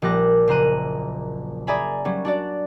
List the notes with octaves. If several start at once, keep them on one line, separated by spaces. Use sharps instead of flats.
A#1 G3 G4 D6 F#6 A#6
F#1 C5 A#5 F#6 D#7
G#4 D5 E5 G#5 A#5 B5
F#3 G3 C#4
D4 F#4 D5